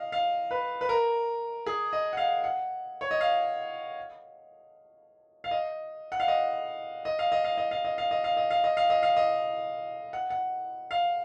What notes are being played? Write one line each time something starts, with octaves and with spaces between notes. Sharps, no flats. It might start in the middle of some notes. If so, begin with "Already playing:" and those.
Already playing: D#5 F5
F5
B4
B4
A#4
G#4
D#5
F#5
F5
F#5
C#5
D#5
F5
F5
D#5
F#5
F5
D#5
D#5
F5
D#5
F5
D#5
F5
D#5
F5
D#5
F5
D#5
F5
D#5
F5
D#5
F5
D#5
F#5
F#5
F5